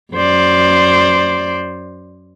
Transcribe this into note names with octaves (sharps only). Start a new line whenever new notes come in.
F#2 C5 D5